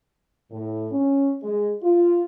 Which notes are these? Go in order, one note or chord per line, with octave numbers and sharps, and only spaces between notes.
A2
C#4
G#3
F4